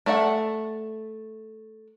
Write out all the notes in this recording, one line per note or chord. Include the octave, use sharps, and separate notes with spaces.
A3 D5 E5 F#5